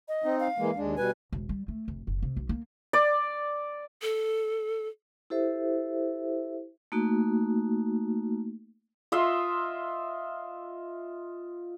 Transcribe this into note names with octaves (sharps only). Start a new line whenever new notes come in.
D#5
C4 D#4
F5
E3 G#3 A#3
D#2 G#3 D4
B2 G3 B4 G#5
E1
G3
A3
F1
F#1
C3
B1
A#3
D5
A4
E4 G4 A4 C5 E5
A3 A#3 D#4 F#4
F4 D#5 E5 C6